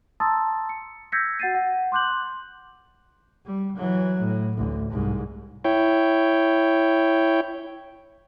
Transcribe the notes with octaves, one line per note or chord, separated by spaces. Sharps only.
A5 A#5 C6 D#6 E6 A6
C#7
E6 G6 G#6 A#6 B6 C#7
F#4 F#5 G6 A6 C7 D#7
F#5
C6 D6 F#6 G6 F#7
G3
E3 F#3
A2
A1 D2
C2 G#2
E4 C#5 G5